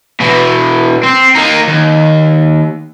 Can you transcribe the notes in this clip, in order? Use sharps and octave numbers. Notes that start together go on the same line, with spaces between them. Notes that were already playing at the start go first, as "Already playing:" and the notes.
B2 E3
C4
A#3 D#4
D#2